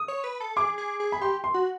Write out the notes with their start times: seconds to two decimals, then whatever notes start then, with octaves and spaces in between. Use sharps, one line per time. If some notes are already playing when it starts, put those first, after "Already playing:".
Already playing: D#6
0.08 C#5
0.24 B4
0.40 A4
0.56 G#4 D6
0.78 G#4
1.00 G#4
1.12 B5
1.21 G4 C6
1.44 C6
1.54 F#4